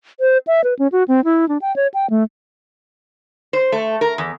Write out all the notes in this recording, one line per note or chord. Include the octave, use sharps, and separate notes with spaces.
C5
E5
B4
C#4
F#4
C4
E4
D4
G5
C#5
G5
A3
C5
A3
A#4
E2